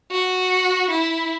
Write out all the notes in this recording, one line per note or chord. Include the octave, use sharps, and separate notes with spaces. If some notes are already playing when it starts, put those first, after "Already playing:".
F#4
E4